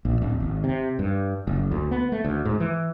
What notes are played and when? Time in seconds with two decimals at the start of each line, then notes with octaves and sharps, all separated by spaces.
0.05 A#1
0.22 D1
0.40 G#1
0.64 C3
0.99 G2
1.47 F#1
1.71 D2
1.91 B3
2.12 A3
2.25 D2
2.45 G#2
2.60 E3